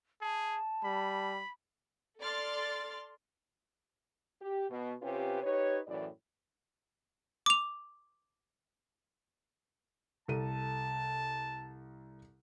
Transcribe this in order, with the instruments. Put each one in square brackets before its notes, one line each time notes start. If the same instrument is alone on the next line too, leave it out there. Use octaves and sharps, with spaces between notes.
[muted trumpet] G#4 [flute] A5
[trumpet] G3 [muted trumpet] B5
[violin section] A4 D5 C6 F6 A6
[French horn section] G4
B2
C3 C#4 F4 G4 B4
D#4 G4 B4 C#5
F#2 A2 E3 E4 F#4 D5
[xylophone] D6 F7
[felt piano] C2 A4 D#7 [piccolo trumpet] A5